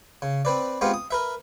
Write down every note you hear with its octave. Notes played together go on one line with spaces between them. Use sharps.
C#3
C4 B4 D5
G#3 B3 C4 F4 G4
D#6
A#4 B4 E5